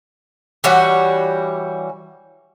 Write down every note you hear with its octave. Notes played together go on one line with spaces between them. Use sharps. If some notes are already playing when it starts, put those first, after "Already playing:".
E3 G3 F#4 C#5